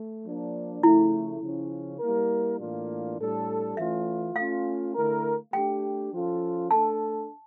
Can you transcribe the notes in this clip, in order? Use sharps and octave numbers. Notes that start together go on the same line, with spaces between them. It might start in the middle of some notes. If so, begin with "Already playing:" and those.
Already playing: A3
F3 A#3 D4
C#3 F3 A3 E4
C#3 F3 C#4
G3 A#3 E4 A#4
A2 E3 A#3 D4 F4
A2 G3 D4 A4
E3 A3 C#4 F4 E5
A3 C#4 F4 F5
D3 A3 E4 A#4
A3 D4 G4 G5
F3 C#4 F4 A4
A3 D4 A4 A5